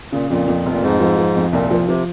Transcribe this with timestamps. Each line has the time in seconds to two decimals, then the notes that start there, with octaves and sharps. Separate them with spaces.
0.12 A#2 C#3
0.30 F2 A#2
0.48 F2
0.66 F1
0.72 A#2
0.83 F2 G#2
1.00 F3
1.18 F3
1.36 F2
1.53 C2 A#2
1.71 F3
1.88 C3 F3